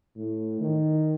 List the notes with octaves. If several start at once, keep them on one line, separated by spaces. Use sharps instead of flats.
A2
D#3